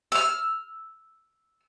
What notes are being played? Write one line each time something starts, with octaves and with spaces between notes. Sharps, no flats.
E6 F6